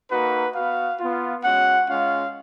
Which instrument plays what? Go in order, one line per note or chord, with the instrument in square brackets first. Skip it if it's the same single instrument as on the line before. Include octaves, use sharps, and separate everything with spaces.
[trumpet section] A#3 D#4 F#4 B4
B3 F#4 F5
B3 F4
G#3 C#4 F#4 F#5
G#3 C#4 F4 F5